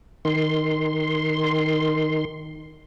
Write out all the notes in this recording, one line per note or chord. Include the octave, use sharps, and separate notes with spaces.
D#3 C6